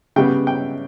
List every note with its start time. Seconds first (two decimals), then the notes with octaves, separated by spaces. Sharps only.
0.16 C#3 G3 B3 G5
0.47 G5